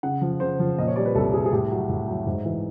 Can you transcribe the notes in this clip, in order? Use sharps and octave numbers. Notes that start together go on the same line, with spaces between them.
C#3 F#5
F3
C#3 C5
F3
A#2 D#5
C#5
G3 D5
B4
C2 A4
C2 G#4
G#4
A2 G4
F#3
A2
F#3
G#2
E3